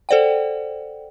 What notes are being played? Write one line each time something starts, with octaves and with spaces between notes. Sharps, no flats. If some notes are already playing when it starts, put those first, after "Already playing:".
A4 C5 D5 F#5 G5